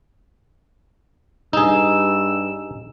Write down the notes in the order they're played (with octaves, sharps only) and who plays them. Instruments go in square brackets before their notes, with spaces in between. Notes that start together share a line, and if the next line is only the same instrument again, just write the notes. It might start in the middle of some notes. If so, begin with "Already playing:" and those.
[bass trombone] G2 [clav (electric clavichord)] D#4 G#4 [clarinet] E6